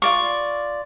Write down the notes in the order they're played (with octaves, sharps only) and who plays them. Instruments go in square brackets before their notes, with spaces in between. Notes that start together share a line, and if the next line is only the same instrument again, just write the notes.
[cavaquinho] F4 D5 C#6